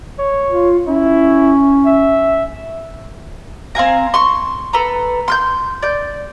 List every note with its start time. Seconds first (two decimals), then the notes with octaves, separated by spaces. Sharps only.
0.19 C#5
0.48 F4
0.87 C#4 E4
1.86 E5
3.75 C4 F5 G#5 A#5
4.14 C6 C#6
4.73 A4 B4 A#5
5.28 C6 F6 G6
5.83 D5 G6